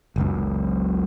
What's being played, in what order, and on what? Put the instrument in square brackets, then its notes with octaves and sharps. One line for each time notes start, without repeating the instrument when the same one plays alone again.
[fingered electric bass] F#1 C#2 F#2